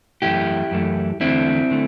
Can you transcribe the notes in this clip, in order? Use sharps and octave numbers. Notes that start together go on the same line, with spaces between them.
F#2 E3 A3 E4 G4
F#2 E3 A3
E2 D3 A3 C4 E4
D3 A3